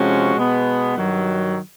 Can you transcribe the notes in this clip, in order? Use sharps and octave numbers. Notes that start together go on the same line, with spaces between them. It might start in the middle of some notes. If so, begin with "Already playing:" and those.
Already playing: C3 F3 G#3 C#4 F#4
B2 G#3 B3
G2 D#3 F#3